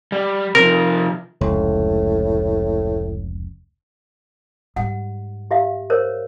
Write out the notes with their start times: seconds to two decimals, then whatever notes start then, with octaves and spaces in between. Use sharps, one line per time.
0.12 G3
0.55 C3 F3 A#4
1.41 F1 C#2 A2
4.76 G#2 G3 F#5
5.51 G4 E5 F5
5.90 A#4 C5 C#5